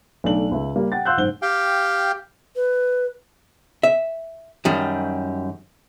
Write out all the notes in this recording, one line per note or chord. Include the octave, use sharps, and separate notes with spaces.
B1 A3 D4 F#7
C#2 E5
G3 A#3
F#5 G5 A6
F5 F#5 C6 E6 F#6 G6
F#1 G#2 C5 G7
G4 F5 G5
B4
E5
F#2 D#3 G3